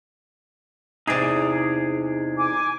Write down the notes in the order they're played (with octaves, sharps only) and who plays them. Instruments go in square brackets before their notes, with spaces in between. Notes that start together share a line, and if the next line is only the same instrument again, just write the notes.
[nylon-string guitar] E2 C3 [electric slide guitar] D#4 G#4 D5
[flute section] G#5 D6